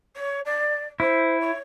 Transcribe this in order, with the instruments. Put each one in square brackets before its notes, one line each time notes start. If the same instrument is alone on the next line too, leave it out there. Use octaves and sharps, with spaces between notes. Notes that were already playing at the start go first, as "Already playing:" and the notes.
[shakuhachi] C#5
D5
[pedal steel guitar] E4 [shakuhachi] C5
[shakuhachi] C#5